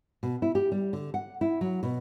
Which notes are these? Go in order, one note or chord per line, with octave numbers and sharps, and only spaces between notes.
B2
E4
G4
G3
D3
F#5
E4
F#3
B2